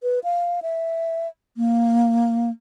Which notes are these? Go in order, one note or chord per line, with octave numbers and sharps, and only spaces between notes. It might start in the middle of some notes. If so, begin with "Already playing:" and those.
B4
F5
E5
A#3